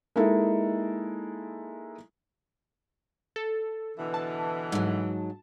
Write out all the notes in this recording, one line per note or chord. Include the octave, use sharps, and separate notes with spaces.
G#3 A#3 D#4 E4 A4
A4
B2 D3 E3
A5
G#2 F#3